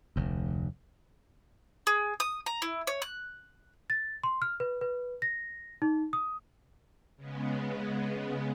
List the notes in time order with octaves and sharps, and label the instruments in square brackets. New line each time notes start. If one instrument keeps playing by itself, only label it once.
[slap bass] F1 D2
[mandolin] G#4
D#6
A#5
E4
C#5
F#6
[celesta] A6
C6
F6
B4
B4
A#6
D#4
D#6
[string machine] C#3 G#3 B3